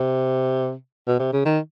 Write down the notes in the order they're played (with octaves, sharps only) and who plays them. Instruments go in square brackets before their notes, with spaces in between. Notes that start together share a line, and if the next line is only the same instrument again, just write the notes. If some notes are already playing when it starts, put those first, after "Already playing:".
Already playing: [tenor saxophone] C3
B2
C3
C#3
D#3